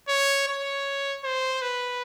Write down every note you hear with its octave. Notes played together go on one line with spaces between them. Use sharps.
C#5
C#5
C5
B4